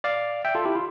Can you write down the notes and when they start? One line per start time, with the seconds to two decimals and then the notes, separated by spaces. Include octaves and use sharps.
0.04 D5 F5
0.45 E5 G5
0.55 F4 A4
0.65 E4 G4
0.75 F4